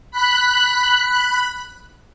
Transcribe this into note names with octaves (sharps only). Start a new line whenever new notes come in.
B5 F#6